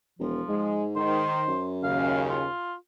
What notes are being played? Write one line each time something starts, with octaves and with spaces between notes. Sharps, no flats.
E1 F3
G#2 G#3
D#3 C5
F#2
D#2 C#3 F5
F4